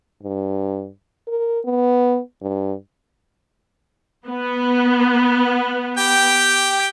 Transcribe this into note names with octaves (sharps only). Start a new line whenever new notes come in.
G2
A#4
B3
G2
B3
G4 G5